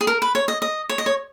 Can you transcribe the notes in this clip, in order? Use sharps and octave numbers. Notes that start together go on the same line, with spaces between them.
G#4
A#4
B4
C#5
D#5
D#5
C#5
D#5
C#5